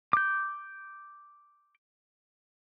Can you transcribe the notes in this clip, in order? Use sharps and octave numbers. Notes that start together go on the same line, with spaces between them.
D6 G6